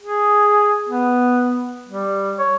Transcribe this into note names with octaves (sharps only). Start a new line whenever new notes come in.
G#4
B3
G3
C#5